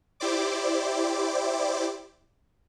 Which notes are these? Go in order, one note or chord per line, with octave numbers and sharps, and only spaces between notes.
E4 G4 C5 D5 D6